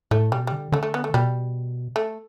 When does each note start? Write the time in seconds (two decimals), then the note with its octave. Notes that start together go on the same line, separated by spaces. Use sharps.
0.11 A2 A3
0.31 B2 G3
0.47 D3 G3
0.72 D3 A3
0.83 A3
0.94 B3
1.04 A3
1.14 B2 G3
1.96 A3